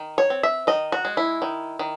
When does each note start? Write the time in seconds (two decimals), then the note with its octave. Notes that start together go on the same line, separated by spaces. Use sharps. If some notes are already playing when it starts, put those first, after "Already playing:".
Already playing: D#3
0.18 C#5
0.30 C4
0.43 E5
0.67 D#3 D#5
0.92 F#4
1.05 G#3
1.17 E4
1.42 D#3
1.79 D#3